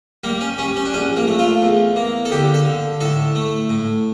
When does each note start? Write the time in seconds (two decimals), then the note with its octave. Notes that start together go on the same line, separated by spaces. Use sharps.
0.24 G3 A#3
0.41 C#4
0.58 G3 C#4
0.77 C#4
0.85 D4
0.94 A#1 C#4
1.16 A#3
1.27 A3
1.39 F4
1.62 E2
1.96 A#3
2.25 A4
2.32 D3 G4
2.54 A4
2.65 D3
3.01 A2 A4
3.35 A3
3.69 A2